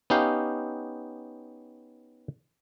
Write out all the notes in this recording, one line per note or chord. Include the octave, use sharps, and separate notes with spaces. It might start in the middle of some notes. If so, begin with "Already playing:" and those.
B3 C#4 D#4 G4 F5